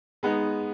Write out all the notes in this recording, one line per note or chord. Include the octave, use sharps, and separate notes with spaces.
G#3 B3 D#4